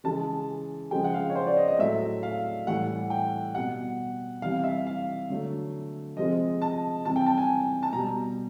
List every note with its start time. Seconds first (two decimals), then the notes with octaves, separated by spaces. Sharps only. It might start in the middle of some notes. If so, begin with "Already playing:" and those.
0.04 C#3 E3 G#3 A5
0.91 C#3 F3 G#3 G5
1.04 F#5
1.14 F5
1.30 C#5
1.35 C5
1.47 D5
1.57 D#5
1.68 D#5
1.79 A2 F#3 A3 E5
2.23 F5
2.67 A2 E3 G3 F#5
3.10 G5
3.54 B2 G3 F#5
4.42 C3 E3 G3 F5
4.64 E5
4.86 F5
5.30 D3 F#3 A3
6.17 C3 F3 G#3 D#5
6.62 A5
7.05 C3 E3 G3 A5
7.16 G5
7.26 A5
7.37 G#5
7.83 A5
7.93 B2 G3 A#5